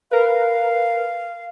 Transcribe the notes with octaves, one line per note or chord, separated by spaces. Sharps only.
A#4 B4 F5